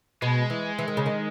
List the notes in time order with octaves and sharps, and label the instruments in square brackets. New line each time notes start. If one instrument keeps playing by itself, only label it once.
[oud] B2 [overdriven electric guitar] G#3
[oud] E3
E3
D#3
C#3
D#3